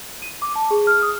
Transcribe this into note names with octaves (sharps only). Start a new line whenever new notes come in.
D#7
D6
A5
G#4
F6
D#6